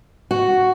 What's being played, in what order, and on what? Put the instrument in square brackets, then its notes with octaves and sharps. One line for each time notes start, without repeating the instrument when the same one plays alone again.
[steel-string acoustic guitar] F#4